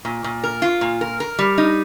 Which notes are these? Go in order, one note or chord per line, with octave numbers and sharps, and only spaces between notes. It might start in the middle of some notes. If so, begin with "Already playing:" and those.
A#2
A#2
A#4
F4
A#2
A#4
A#4
G3
D#4